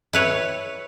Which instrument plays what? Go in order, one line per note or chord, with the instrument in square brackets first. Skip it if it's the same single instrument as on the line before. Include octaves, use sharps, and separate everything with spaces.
[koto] E4 B4 C#5